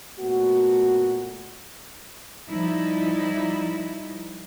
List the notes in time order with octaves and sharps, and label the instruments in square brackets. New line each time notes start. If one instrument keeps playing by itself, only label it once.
[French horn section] A#2 A3 B3 F#4
[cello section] F3 G3 D#4 E4